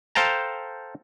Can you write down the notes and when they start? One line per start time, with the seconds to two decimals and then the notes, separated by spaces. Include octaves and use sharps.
0.15 A4 C5 F5 G5 A5 A#5